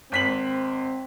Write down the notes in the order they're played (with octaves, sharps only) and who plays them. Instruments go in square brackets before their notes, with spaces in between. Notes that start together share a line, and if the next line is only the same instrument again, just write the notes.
[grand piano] G#1 B6 F#7 [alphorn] C4